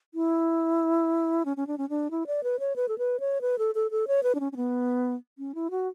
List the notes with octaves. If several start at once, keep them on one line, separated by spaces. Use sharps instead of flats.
E4
C#4
C#4
D4
C#4
D4
E4
D5
B4
C#5
B4
A4
B4
C#5
B4
A4
A4
A4
C#5
B4
D4
C#4
C#4
B3
C#4
E4
F#4